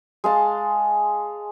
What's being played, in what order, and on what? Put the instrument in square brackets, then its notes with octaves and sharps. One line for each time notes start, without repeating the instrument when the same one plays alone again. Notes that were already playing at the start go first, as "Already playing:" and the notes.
[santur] G#3 F5 A5